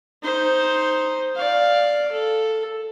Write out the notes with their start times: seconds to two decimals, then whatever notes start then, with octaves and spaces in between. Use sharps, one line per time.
0.23 D#4 C5
1.36 D5 F5
2.11 A4